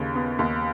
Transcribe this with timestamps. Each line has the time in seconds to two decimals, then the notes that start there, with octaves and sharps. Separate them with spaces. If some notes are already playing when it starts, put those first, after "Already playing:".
Already playing: D#2 C#3
0.15 B3
0.39 D#2